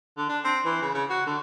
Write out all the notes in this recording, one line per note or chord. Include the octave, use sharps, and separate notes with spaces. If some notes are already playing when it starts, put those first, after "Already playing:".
D3
D4
C4
E3
C#3
C#3
F#4
D3